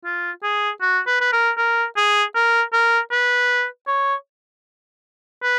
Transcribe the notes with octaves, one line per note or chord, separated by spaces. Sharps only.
F4
G#4
F#4
B4
B4
A#4
A#4
G#4
A#4
A#4
B4
C#5
B4